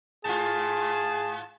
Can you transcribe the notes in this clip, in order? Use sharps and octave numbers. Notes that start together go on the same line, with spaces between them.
G#2 F4 G#4 A5